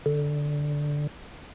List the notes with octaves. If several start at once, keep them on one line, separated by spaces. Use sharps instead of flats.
D3